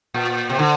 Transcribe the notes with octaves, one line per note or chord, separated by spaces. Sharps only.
A#2
C3
D3